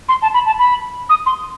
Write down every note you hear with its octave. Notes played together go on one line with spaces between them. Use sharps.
C6
A5
B5
A5
B5
D#6
C6